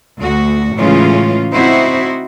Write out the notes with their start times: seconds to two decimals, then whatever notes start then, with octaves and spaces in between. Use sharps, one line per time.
0.18 D2 F#4
0.77 A2 C#3 E3 G#3 C#4 F4
1.54 C4 D#4 E4 F#4 C5